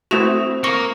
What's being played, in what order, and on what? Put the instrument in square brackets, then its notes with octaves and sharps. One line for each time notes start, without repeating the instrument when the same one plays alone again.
[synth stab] A3 E4 F#4 [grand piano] C4 D#6 F7 [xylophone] E7
[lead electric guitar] A#3 A#4 [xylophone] C#6 A#6 C#7